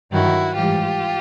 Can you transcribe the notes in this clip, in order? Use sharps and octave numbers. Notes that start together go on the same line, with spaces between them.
G2 D#3 F#3 E4 F#4
G#2 E3 G3 F4 G4